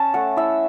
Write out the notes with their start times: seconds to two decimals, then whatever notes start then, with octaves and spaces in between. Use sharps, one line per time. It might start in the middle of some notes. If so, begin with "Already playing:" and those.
Already playing: C#4 A5
0.14 A3 F#5
0.37 E4 E5